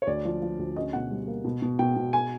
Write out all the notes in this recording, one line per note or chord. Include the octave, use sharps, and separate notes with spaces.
C#5
D2 D5
F3
F3
D2
C#4 D#5
B2 F#5
G3
A#3
B2
B2
B2 G5
B2
G#5